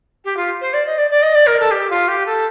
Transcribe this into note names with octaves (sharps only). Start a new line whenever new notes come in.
G4
F4
C5
D5
D#5
D5
D5
D#5
D5
A#4
A4
G4
F4
G4
A4